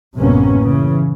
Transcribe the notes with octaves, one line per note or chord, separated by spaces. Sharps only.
A1 F#2 C3 A#3 B3 C#4
C#3 E3